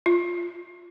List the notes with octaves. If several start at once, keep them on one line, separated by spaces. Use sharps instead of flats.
F4